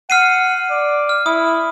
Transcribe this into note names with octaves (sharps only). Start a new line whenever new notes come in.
F#5 F6 C7 D#7
D5
F6
E4 D#6